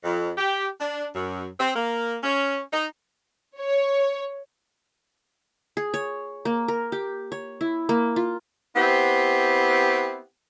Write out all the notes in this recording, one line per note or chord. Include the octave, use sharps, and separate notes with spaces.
F2
G4
D4
F#2
C4
A#3
C#4
D#4
C#5
G#4
C#5
A#3
A#4
G4
C#5
E4
A#3
F4
B3 C4 E4 G4